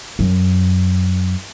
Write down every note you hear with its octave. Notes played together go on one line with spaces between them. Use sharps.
F#2